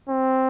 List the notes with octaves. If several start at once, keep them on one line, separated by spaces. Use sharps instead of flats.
C4